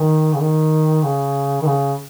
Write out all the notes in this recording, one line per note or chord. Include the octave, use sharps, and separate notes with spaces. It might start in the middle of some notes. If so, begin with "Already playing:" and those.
Already playing: D#3
C#3
D#3
C#3
D#3
C#3